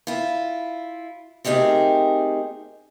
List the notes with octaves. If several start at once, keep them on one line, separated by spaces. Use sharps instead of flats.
E4 F4
A3 C4 D#4 G4 G#4 A#4